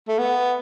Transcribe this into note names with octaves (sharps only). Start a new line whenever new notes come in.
A3
B3